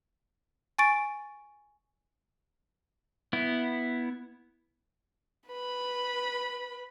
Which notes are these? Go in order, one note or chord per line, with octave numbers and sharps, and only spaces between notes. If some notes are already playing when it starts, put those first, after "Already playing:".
G#5 C#6 A6 D7
B3 E4
B4 B5